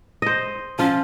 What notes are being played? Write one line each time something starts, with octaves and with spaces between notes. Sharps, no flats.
C5 D#5
F3 C#4 F4